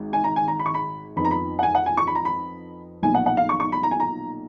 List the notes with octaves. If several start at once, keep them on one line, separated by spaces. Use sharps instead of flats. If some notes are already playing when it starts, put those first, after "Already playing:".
Already playing: G#1 G#2
G#5
A#5
G#5
A#5
B5
C#6
B5
F2 F3 B3 D#4 B5
A#5
B5
F#5
G#5
F#5
G#5
C#6
B5
A#5
B5
B1 A#2 F3 G#5
F#5
F#5
F5
C#6
C#6
B5
A#5
G#5
A#5